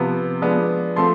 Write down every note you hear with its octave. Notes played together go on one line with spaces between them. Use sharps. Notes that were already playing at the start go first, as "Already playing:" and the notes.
Already playing: C3 F3 B3
F3 G#3 B3 D4
F3 A3 C4 C6